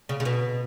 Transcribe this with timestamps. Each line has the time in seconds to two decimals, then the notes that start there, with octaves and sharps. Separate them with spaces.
0.09 C#3
0.20 C#3
0.25 B2